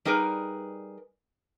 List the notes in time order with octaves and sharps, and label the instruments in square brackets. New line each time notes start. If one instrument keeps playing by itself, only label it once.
[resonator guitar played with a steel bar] G3 D#4 G#4 A#4 B4